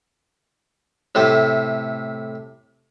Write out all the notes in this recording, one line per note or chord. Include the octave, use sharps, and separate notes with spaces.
A2 C3 A3